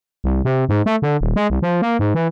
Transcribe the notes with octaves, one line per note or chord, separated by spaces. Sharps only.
C2
C3
G#2
A3
D3
D#1
G#3
C2
F3
A#3
G#2
E3